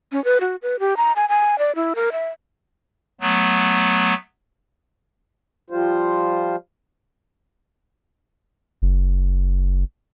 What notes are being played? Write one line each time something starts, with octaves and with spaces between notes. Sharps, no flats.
C#4
B4
F#4
B4
G4
A#5
G#5
G#5
D5
E4
A#4
E5
F#3 A3 B3
F3 G3 F4 C5
F#1